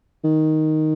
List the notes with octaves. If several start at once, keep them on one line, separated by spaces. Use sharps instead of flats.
D#3